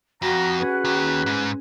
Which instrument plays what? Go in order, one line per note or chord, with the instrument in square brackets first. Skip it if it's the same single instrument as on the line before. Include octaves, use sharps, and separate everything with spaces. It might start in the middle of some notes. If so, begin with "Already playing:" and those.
[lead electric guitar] F2 [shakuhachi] F#4 [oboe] A#5
[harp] C#4 G#4 [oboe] B4
[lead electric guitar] D#2
G#2